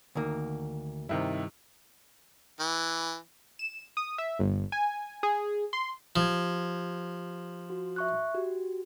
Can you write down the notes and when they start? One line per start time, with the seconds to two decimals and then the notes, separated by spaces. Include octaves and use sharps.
0.15 D2 D#3 A#3
1.09 G2 C3 D#3 E4
2.60 E3
3.59 E7
3.97 D#6
4.18 E5
4.39 G1
4.72 G#5
5.23 G#4
5.73 C6
6.16 F3 G4 G#6
7.70 F#4
7.96 E5 C#6 F#6
8.35 F#4 G4